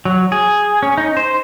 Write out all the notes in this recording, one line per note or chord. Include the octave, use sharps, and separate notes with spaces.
F#3
G#4
C#4
D#4
C5